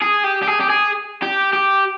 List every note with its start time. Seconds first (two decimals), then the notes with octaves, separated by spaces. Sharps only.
0.02 G#4
0.24 G4
0.42 G4
0.47 G#4
0.60 G4
0.70 G#4
1.22 G4
1.53 G4